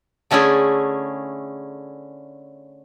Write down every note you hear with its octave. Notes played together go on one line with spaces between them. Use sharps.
D3 A3 C#4 E4 G#4